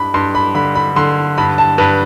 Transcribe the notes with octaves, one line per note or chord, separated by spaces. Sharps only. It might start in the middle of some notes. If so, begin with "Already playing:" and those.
Already playing: G2 B5
G2 C6
B5
D3 B5
B5
D3 C6
G2 B5
A5
G2 B4